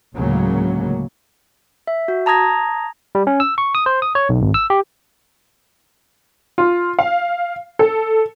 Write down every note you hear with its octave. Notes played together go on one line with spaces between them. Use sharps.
D2 A2 C#3 F#3 G#3 A#3
E5
F#4
A5 A#5 D#6 G#6 A#6
G3
C#4
E6
C#6
D#6
C5
D#6
C#5
B1
G#1
E6
G4
F4
F5
A4